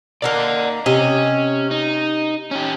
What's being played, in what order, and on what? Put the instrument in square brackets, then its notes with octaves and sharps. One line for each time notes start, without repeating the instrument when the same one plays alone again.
[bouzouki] A#3 D#4 A#4 [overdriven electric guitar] D5 F#5
[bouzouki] C3 D#5 [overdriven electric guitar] C#4
[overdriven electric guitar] D#4
C#4 G4